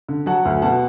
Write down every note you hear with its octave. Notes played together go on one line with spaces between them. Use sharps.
D3
F#3 F#5 A5
D2
B2 F#5 A5